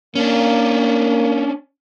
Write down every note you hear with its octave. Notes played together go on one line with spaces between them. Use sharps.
A#3 C#4 D4